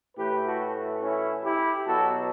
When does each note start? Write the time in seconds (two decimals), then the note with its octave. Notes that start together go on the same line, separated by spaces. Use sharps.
0.17 A2 E3 A3 G4 B4
0.46 F#4 A4
1.02 C#4 E4
1.44 E4 G4
1.87 B2 F#3 B3 F#4 A4